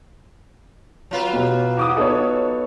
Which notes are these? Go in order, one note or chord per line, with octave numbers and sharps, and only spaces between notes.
F#3 F4 B4
B2 G4
E2 D6 D#6
B3 D#4 A4 C#5